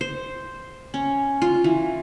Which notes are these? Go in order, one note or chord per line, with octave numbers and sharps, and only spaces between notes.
C5
C#4
F4
E3